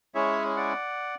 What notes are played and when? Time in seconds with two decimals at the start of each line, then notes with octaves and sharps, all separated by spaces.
0.15 G#3 C#4 E4 G#4 C#5 E5
0.56 D5 F#5